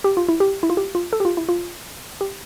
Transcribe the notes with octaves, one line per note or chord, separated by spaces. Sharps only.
G4
F4
E4
G4
E4
F4
G4
F4
A4
G4
F4
E4
F4
G4